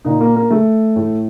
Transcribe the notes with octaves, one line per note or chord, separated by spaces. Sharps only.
A#2 D#4
A#3
A#3
A3
A2